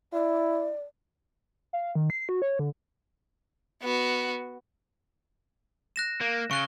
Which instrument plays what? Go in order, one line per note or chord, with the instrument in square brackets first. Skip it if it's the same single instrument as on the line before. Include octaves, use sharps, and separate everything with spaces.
[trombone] E4 [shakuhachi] D5
[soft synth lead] F5
D#3
C7
F#4
C#5
D3
[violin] B3 F#4
[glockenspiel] F#6 A#6 E7
[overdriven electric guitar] A#3
[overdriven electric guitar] C#3 [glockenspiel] C#6 F#6 G7